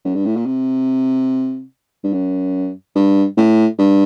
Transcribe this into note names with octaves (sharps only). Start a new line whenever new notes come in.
F#2
G2
A2
A#2
C3
G2
F#2
G2
A2
G2